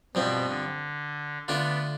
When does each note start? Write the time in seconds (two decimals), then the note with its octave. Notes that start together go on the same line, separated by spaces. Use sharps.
0.15 G2 B2 F3 C4
0.48 D3
1.48 D3 A3 B3 D4 F4